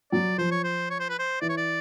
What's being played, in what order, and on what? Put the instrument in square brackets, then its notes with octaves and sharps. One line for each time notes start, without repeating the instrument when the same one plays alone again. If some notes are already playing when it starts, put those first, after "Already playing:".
[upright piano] F#3 [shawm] D5
[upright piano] F3 [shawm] C5
[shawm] C#5
C5
C#5
C5
B4
C5
[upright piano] E3 [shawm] D5
[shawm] C#5
D5